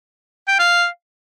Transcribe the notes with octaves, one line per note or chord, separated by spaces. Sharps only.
G5
F5